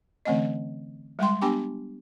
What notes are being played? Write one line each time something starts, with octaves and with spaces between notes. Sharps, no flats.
D3 E3 A3 C4 C#4 D#5
G3 G#3 G5 C6
B3 D4 G4 G5 G#5 D6